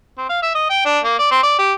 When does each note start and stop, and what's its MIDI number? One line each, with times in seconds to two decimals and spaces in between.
0.18 0.26 60
0.29 0.39 77
0.43 0.50 76
0.55 0.66 75
0.70 0.83 79
0.85 0.99 62
1.04 1.16 58
1.19 1.27 74
1.31 1.41 60
1.43 1.55 74
1.59 1.73 67